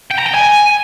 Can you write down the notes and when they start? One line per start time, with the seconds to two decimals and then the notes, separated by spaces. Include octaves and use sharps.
0.11 G5
0.18 A#5
0.26 G5
0.34 G#5